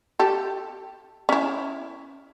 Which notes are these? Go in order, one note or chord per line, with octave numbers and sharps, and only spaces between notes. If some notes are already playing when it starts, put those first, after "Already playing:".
G4 A4
C#4 E4